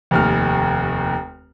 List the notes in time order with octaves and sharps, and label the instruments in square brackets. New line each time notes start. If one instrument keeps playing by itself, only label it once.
[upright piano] F1 D#2 F6